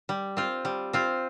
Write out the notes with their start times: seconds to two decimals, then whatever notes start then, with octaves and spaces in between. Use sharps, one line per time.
0.09 G3
0.37 C4 F4
0.65 G3
0.93 C4 F4